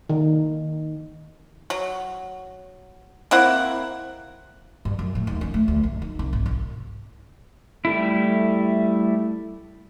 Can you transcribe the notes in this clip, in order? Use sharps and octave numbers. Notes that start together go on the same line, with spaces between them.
D#3
F#3
A#3 C4 E4 F#5
G2
F#2
A2
D#2
C#4
A3
D2
G2
D#4
C2
G#1
C2
G3 A3 E4